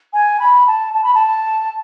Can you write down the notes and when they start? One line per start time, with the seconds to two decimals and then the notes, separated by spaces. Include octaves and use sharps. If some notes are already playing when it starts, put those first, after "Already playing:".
0.14 G#5
0.40 B5
0.67 A5
0.94 A5
1.04 B5
1.14 A5